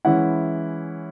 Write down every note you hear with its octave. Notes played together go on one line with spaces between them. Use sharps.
E3 G#3 C#4 E4 F#5